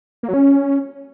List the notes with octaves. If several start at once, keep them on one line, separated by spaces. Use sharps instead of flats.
A#3
F#3
C#4